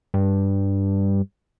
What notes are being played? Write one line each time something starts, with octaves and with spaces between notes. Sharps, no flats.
G2